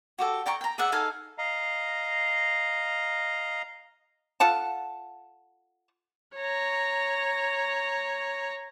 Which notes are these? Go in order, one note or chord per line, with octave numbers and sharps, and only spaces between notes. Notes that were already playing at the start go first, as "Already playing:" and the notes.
F#4 G4 A4
D5 G5 A#5 C#6
G5 A#5
G#4 D5 E5 F#5
D#4 A4 F5 G#5
D#5 F5 A#5
F4 A4 F#5 A5
C#5 A#5